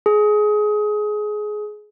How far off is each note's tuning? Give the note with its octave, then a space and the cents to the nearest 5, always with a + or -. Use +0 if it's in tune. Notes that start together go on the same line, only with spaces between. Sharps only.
G#4 +20